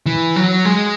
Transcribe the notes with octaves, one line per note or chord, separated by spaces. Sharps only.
E3
F#3
G#3